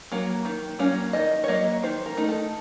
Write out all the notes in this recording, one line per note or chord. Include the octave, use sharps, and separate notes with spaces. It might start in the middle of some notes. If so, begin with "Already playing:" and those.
F#3 A#3
D#3
F#3 A#3 C#4
D#3 D#5
C#5
F#3 A#3 D#5
D#3 C5
A#4
A3 D#4
A4